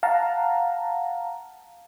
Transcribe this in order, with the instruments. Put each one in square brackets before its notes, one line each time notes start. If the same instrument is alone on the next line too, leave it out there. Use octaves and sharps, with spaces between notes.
[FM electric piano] F5 F#5 A5 A#5